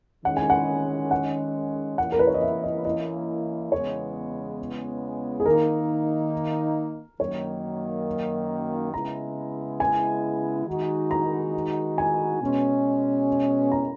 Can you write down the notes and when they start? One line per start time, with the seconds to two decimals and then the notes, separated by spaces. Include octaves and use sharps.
0.24 D#3 G#3 C#4 F#5
0.37 G#5
0.50 F#5
1.11 F#5
1.98 E3 A#3 C#4 E4 F#5
2.12 A#4
2.19 B4
2.27 C#5
2.34 D#5
2.42 E5
2.64 D#5
2.85 D#5
3.72 E2 C#3 G#3 B3 C#5
5.40 G#4
5.46 D#3 A#3 D#4 A#4
7.20 F#2 D#3 F#3 A#3 C#5
8.93 C#3 G#3 B3 E4 A#5
9.80 G#5
10.67 D#3 G#3 D#4 F#4
11.11 A#5
11.98 G#5
12.41 B2 G#3 C#4
13.72 A#5